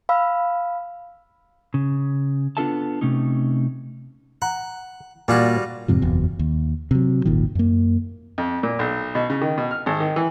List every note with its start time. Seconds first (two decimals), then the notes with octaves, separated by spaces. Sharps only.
0.09 F5 B5 E6
1.74 C#3
2.57 B3 D4 F4 A4 E5 A5
3.01 C3 A3 C#4 D#4
4.42 F#5 A#5
5.28 A#2 G3 F4 F#4 D5 G#5
5.88 F2 G#2 C3 F3
6.02 F#1 E2 B2
6.39 D#2
6.91 C3 F#3
7.25 D#1 G#1 A#2 D#3
7.55 F#2 A#3
8.38 F2
8.63 A#2
8.79 B1
9.15 B2
9.30 C#3
9.42 D#3
9.58 B2
9.71 F6
9.86 G#1
10.00 D#3
10.16 E3